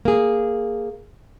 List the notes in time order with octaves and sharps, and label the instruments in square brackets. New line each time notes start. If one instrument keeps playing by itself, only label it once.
[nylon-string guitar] A#3 G#4